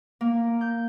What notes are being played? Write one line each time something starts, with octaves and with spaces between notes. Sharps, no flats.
A#3
G6